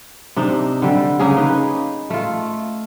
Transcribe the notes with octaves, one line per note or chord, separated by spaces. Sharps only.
C3 D4 D#4
D3 G3
C#3 A#3 C#4 G#4
D#4 B4
A3 F4